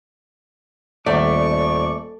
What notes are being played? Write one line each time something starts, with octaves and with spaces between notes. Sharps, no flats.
D#1 A3 D5 F#5 A5 C#6 D6